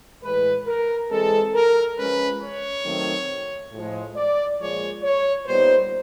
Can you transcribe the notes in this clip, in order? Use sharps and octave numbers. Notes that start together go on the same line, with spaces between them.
A2 E3 G#3 B4
A#4
E3 G#3 C4 A4
A#4
F3 G#3 C#4 B4
C#5
D#3 F#3 A3 C4
A2 F3 G#3
D5
A#2 F3 G#3 C#5
C#5
A#2 G3 B3 D#4 C5